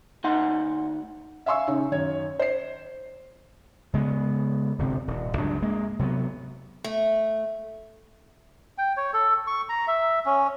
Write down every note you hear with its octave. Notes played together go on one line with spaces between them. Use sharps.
D2 D#4 F#5 C6
E5 F5 G#5 C6 C#6 E6
C#3 C#4 D#4
F#2 D#3 C#5 G#6
C5 C7
C#3 G#3 A3 B3
D1 G1 C3 C4
D#1
G1 C#2 F#3 D4
G#3 A#3
C3 F#3 G3 B3
A3
G5
C#5
A4
C#6
A#5
E5
C#4